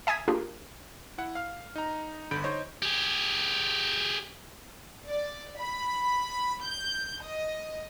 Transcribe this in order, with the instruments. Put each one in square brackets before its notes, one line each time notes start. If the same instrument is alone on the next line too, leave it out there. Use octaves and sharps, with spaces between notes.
[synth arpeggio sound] E5 G#5 D#6 G#6 B6
A#3 D4 F4 G4 G#4 A#4
[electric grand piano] E4 F#5
F5 F6
D#4 A#5
G1 D3 B5 G6 D7
D#4 C5 C#5 D#5
[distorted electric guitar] G4 G#4
[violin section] D5
B5
G6
D#5